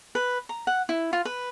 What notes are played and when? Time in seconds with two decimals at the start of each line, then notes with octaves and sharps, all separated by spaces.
0.15 B4
0.49 A#5
0.67 F#5
0.89 E4
1.13 F4
1.25 B4